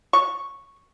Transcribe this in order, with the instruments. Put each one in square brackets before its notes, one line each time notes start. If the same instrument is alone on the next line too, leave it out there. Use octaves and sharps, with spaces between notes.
[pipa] C#6